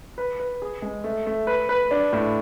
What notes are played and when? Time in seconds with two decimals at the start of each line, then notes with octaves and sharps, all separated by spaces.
0.18 B4
0.40 B4
0.62 G#4
0.82 G#3
1.04 A3
1.26 A3
1.47 B4
1.69 B4
1.91 D4
2.13 A2